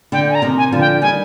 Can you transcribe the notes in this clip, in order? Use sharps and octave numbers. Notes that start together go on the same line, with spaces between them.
D3 G5
G#5
A#5
C3 D#3
G#5
D3 F3
G5
D#3 G3 G#5